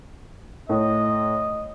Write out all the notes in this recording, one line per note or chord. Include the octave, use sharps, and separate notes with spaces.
A2 D#5